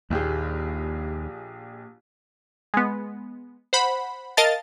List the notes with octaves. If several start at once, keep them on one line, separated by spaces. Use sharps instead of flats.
A#1 D#2 G4 G#4
G#3 B3
C5 F#5 B5
A#4 D#5 F5 A5 A6